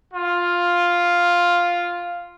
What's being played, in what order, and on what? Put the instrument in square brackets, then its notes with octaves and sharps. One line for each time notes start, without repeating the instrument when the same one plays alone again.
[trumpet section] F4 F5